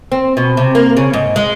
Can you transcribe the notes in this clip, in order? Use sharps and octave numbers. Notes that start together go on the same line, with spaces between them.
C4
B2
C3
A#3
C#3
G#2
G#3